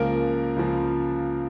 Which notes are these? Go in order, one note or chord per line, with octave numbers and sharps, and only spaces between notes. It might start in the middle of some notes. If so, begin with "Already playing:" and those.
Already playing: C#2 C#3 F3 A#3 A#4
C#2 C#3 F3